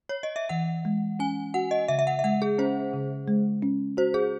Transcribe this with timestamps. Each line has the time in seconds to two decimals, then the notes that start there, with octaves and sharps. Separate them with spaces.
0.09 C#5
0.23 D#5
0.36 E5
0.49 E3 F#5
0.85 G#3
1.19 C#4 G#5
1.54 F#4 F#5
1.71 D#5
1.88 C#3 E5
1.99 E5
2.07 F#5
2.19 E5
2.24 G#3 F#5
2.42 G#4
2.58 C#4 C5
2.93 C#3
3.28 G#3
3.62 C#4
3.97 F#4 C5
4.14 G#4